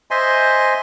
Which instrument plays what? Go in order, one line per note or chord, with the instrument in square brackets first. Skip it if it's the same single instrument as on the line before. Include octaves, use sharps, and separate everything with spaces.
[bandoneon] C5 D#5 E5 G#5 C6